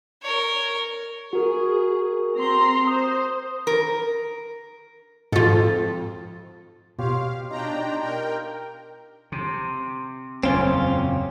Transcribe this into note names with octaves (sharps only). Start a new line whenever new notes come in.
A#4 C#5
F#4 G#4 A#4
C4 A#5 C6
C5 D#6
A#4
F2 G#2 F4 A4
B2 F4 G4 C#5 F5
D4 D#4 G5 A#5
A#4 G5
C3
F#1 E2 A#2 C4 C#4 F4